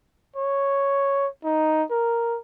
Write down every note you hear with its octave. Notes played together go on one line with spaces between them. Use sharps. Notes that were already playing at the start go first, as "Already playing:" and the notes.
C#5
D#4
A#4